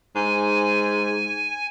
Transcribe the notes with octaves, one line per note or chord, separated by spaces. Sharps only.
G#2 G#5